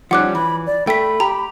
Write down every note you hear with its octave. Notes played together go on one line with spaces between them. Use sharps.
F3 G3 C#4 D#4 F#5 D6 F#6
E3 B5
D5
A3 G5 B5 B6
G4 A#5